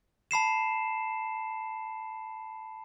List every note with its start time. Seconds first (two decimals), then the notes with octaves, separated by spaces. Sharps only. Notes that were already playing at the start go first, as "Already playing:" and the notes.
0.31 A5 B5 C7 E7